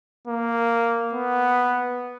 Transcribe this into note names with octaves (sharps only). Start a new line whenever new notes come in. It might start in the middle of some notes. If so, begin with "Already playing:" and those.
A#3
B3